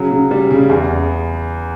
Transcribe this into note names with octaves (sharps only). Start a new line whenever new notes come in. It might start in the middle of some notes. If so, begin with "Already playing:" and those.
Already playing: C#3 F#3
C#3
G3
C#3
E2